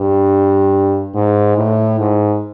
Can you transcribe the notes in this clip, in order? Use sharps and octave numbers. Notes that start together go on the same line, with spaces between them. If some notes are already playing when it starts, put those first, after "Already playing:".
Already playing: G2
G#2
A2
G#2